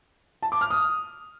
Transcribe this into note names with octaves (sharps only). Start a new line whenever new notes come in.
A5
D6
F6
D#6